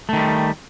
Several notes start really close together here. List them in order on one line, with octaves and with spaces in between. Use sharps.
A3 D#3 G3